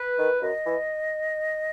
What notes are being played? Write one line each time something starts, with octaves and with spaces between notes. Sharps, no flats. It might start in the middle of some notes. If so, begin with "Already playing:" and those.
Already playing: B4
D#3
F#2 D#5
E3